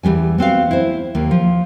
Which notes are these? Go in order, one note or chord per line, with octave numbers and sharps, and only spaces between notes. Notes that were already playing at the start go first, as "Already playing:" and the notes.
E2 G#2 G3 G#5
B3 C4 F#4 F5
E4 C5
D#2 A#3
F3